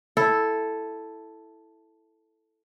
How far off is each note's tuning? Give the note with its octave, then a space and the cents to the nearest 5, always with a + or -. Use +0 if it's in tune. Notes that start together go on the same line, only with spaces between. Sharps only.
E4 +0 A4 +0